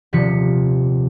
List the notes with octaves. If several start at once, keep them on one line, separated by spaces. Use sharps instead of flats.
D#1 C3 F3 B6 C#7